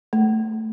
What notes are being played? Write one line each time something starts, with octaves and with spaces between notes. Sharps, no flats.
A3